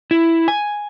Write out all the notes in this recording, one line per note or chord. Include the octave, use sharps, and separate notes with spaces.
E4
G#5